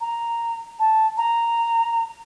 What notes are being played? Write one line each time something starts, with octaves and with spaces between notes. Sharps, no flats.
A#5
A5
A#5